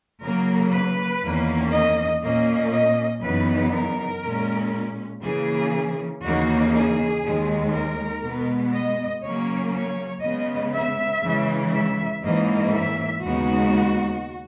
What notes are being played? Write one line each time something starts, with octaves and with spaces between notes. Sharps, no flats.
C#3 F#3 A#3 A#4
B4
E2 D#3 A#3 C#4
D#5
A#2 A#3 C#4 D#5
D#5
F#2 C#3 E3 B3 D#4 B4
A#4
A#2 G#3 C#4
C#3 E3 A#3 C#4 G#4
D#2 C#3 E3 A#3 D#4 F#4
G#4
D#2 D#3 G#3
A#4
B2 G#3 B3
D#5
C#3 F#3 A#3 C#4 C#5
C#5
C#3 G#3 B3 D#5
E5
C#3 E3 G#3
E5
G#2 E3 A#3 C#4 D#5
E5
D#2 C#3 G#3 B3 D#4 F#4